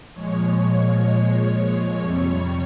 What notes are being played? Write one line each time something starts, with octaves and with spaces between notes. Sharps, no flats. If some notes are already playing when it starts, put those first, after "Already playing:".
A#2 F3 G#3 C#5
F2 C3 G3